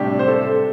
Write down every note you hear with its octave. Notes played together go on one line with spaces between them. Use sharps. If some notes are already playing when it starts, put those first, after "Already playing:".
Already playing: A2 C3 G3 D4 G4
C5
A4